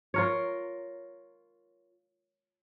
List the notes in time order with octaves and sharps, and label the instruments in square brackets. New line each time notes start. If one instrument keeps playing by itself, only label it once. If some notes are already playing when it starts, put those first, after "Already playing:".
[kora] F4 A#4 C#5